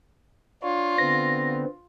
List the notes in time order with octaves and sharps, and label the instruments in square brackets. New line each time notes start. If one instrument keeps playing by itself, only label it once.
[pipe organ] D4 C#5 [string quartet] F4
[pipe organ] D3 B3 C4 [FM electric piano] A#6